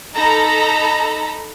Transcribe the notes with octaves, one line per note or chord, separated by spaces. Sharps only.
D#4 A4 A#5 B5